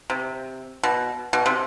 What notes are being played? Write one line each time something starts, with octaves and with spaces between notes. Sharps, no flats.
C3
B2
B2
C3